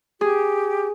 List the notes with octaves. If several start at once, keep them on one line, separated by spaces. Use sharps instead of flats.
G4 G#4